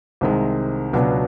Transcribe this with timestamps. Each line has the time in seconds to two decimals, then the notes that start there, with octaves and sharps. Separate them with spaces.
0.21 C2 C3 D#3 G#3
0.93 C#2 B2 F#3 B3 D4